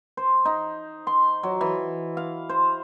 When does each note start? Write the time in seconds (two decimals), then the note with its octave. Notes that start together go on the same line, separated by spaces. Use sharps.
0.17 C5
0.45 D#4
1.07 C6
1.43 F#3
1.61 E3
2.17 F5
2.49 C5